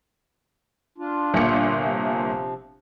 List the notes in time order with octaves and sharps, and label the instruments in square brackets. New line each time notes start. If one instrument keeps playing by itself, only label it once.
[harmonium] D4 F4
[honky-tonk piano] G1 A#2 C#7
[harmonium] C3 F3